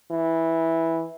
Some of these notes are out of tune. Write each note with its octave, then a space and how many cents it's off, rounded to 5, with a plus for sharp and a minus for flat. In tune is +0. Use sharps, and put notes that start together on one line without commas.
E3 -10